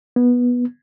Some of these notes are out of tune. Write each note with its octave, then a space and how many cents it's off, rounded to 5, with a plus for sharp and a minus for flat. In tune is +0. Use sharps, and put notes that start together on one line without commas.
B3 -15